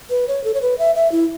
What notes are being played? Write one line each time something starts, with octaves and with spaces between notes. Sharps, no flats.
B4
C#5
A4
C#5
B4
E5
E5
E4